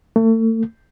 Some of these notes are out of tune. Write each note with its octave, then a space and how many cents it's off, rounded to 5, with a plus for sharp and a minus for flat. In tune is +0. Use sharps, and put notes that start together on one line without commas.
A3 +40